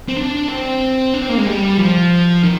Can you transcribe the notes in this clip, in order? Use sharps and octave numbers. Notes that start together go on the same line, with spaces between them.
C4
D4
C4
D4
C4
A#3
G#3
G3
F3
D#3